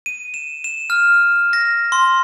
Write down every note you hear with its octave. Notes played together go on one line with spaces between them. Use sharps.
D#7
E7
E7
F6
A#6
C6